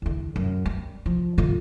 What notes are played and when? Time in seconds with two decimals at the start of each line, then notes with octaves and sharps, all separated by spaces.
0.02 E2 D3
0.36 F#2
0.66 G3
1.06 F3
1.38 D3 F4